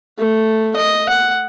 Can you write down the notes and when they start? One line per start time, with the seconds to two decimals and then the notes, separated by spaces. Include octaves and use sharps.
0.19 A3
0.76 D#5
1.09 F#5